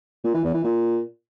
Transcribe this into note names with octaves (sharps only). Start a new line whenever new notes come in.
A#2
E3
E2
E3
A#2